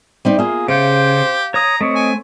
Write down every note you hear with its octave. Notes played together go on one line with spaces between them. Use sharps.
G3 C4 D#4
A#3 F4 G#4
C#3 G4 C5 F5
C#5 A#5 D#6
A3 C4 C#5 D#5
G#5